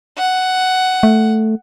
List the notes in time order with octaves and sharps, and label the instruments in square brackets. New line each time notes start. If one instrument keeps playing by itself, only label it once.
[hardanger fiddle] F#5
[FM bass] A3